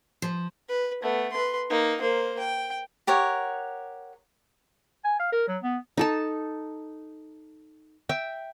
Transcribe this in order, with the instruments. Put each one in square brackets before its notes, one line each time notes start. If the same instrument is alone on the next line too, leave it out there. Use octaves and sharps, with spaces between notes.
[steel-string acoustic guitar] F3
[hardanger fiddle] B4
A3 B3
B4 C6
A#3 D#4
A#3 C5
G5
[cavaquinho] G4 A#4 C#5 F#5
[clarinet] G#5
F5
A#4
F#3
B3
[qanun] D#4 A4 A5
E5 G5